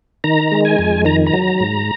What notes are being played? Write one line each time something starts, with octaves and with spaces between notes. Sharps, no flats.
D#3 A#5
G#3
G#5
F2
D#3 A#5
A#5
F#3
G#2